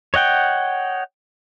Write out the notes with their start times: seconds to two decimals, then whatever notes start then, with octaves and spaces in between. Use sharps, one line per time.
0.14 C#5 D#5 F#5 G5